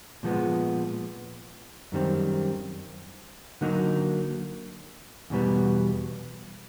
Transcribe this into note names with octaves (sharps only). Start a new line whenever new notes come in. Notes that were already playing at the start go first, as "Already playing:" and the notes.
A#2 F3 G#3 B3
F#2 D#3 G3 C4
D3 F#3 A#3 D#4
E2 B2 G3 B3